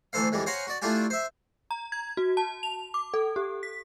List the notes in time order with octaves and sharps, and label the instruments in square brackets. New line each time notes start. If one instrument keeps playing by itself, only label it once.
[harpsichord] D2 E3 A4 C5 F5
F2 E3 G3 G#3
C5 C#5 F5 F#5 G#5 A#5
F#4 D5
A3 D4 E4 F4 G4 G#5
C5 E5
[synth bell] A#5
G#6
F#4
A5
F7
D6
A4
G4
B6